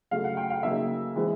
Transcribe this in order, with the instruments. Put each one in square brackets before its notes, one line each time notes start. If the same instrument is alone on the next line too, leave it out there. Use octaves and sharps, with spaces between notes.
[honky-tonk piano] C#3 F#3 A3 F5
F#5
G5
F5
C#3 F#3 A#3 D#4 E5
E3 G#3 C4